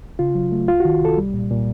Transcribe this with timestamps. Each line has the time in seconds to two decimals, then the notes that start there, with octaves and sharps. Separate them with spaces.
0.19 C#3 F4
0.35 F#3
0.52 A3
0.68 C2 F4
0.80 D#3 F#4
1.01 C2 A4
1.17 G3
1.34 A#2
1.51 A#2